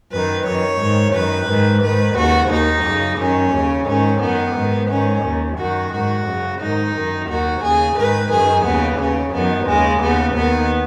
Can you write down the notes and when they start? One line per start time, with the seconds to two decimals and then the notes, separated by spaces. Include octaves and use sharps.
0.11 F#2 D#3 B4
0.45 F#2 D#3 C#5
0.80 G#2 D#3
1.13 F#2 D#3 B4
1.48 G#2 D#3
1.81 G#2 D#3 B4
2.16 D#2 C#3 F#4
2.50 D#2 D#3 D#4
2.84 F#2 C#3
3.18 F#2 D#3 C#4
3.53 D#2 C#3
3.86 G#2 D#3 C#4
4.20 F#2 D#3 B3
4.56 G#2 D#3
4.89 G#2 D#3 C#4
5.24 D#2 D#3
5.57 F#2 D#3 F#4
5.92 G#2 D#3 F#4
6.26 F#2 C#3
6.59 G#2 D#3 D#4
6.94 F#2 D#3
7.28 D#2 D#3 F#4
7.63 D#2 C#3 G#4
7.97 G#2 D#3 B4
8.30 F#2 D#3 G#4
8.64 D#2 C#3 B3
8.99 D#2 C#3 C#4
9.33 F#2 D#3 B3
9.67 D#2 C#3 G#3
10.01 D#2 C#3 B3
10.35 D#2 D#3 B3